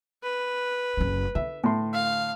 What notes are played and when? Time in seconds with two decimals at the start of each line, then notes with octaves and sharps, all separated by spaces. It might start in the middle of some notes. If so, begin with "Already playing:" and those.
0.23 B4
0.97 F#1 C#4
1.35 D3 E5
1.64 A2 C6
1.93 F5